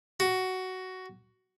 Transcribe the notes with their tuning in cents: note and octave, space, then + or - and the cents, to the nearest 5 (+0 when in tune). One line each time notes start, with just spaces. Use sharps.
F#4 +10